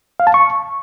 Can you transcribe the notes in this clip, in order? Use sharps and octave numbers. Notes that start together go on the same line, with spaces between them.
F5
A5
C#6